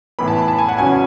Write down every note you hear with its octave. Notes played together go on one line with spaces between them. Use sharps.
A2 E3 B3 B5
A5
B5
A5
G#5
F#5
E2 C#3 F#3 C#4 G#5